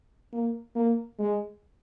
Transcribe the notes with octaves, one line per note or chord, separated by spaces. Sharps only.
A#3
A#3
G#3